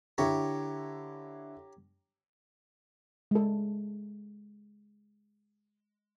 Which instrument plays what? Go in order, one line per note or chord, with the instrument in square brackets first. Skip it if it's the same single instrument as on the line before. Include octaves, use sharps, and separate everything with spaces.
[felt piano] D3 E4 C#6 [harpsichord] G4 C#5 A#5
[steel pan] G#3 A4